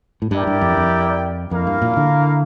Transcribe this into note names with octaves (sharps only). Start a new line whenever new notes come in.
A2
G2 E4 G4 A#4 D5 G5
G2
F2
F2
F2 A#3 E4 A#4 F5
G2
A#2
D3